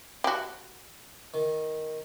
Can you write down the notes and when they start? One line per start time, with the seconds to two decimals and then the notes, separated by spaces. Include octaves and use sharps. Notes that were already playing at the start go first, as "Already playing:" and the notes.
0.24 F#4 G4
1.34 D#3